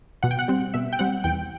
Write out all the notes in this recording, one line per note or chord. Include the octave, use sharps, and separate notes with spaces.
B2 F#5
G5
F#5
G3 C4
B2 E5
G5
G3 C4 F#5
E2 G5